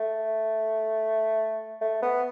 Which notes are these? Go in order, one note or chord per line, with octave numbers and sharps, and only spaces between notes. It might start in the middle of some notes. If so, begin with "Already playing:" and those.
Already playing: A3
A3
B3